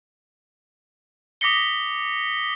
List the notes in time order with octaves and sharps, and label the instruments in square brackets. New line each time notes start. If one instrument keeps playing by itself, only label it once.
[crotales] D6 D#6 A#6 B6 C#7 G7